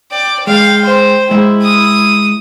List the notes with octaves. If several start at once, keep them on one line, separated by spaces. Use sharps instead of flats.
D5 G5
G#3 F5 G5
C5
G#3 E4 G5
D#6